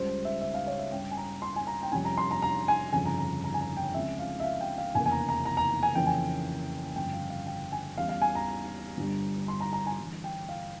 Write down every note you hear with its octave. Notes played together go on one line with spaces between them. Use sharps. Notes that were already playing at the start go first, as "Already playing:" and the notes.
Already playing: C#2 C#3 G3 C5
E5
E5
F5
C#5
E5
G2 G3 C#4 G5
G#5
A#5
C6
G#5
A#5
G5
F2 C3 G3 C#4 G#5
A#5
C6
A#5
A#5
G#5
G1 F2 C#3 G#5
A#5
A#5
A#5
G#5
A#5
G5
C#2 C#3 F3 C4 E5
F5
E5
F5
G5
F5
F1 E2 C#3 E3 A#3 G#5
G#5
A#5
A#5
A#5
A#5
G#5
F2 C#3 E3 A#3 C#4 G5
G#5
G1 F2 C#3 G5
F5
F5
G5
G#5
E2 E3 G3 C#4 F5
F5
G#5
A#5
G1 G2 G3
C6
A#5
A#5
G#5
G1 G2 E3
G5
F5